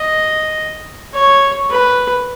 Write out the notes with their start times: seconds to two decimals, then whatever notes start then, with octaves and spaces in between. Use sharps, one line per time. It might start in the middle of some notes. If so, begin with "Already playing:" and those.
Already playing: D#5
1.14 C#5
1.70 B4